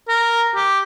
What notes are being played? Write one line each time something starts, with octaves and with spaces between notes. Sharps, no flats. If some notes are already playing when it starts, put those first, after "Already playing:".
A#4
G4